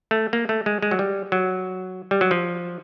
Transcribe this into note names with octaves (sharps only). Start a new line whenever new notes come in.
A3
A#3
A3
G#3
G#3
F#3
G3
F#3
G3
F#3
F3